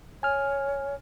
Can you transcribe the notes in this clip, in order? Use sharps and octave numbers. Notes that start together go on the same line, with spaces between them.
C#5 G#5 F6